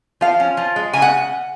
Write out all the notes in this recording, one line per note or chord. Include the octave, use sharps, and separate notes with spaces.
F3 F5
C#4
F3
G#3
C#3 G#5
F#5